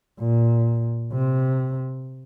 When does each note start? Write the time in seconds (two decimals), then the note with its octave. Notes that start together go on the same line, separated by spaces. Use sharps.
0.19 A#2
1.12 C3